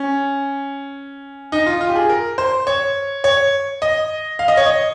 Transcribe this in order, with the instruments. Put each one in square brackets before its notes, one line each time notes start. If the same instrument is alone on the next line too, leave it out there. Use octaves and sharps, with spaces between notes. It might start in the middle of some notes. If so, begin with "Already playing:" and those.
Already playing: [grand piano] C#4
D#4
F4
F4
G4
G#4
A#4
C5
C#5
C#5
D#5
F5
D#5
C#5
D#5